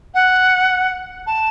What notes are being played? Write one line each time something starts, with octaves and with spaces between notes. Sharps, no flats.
F#5
A5